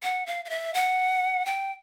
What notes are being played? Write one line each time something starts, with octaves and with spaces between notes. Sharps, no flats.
F#5
F5
F5
E5
F#5
G5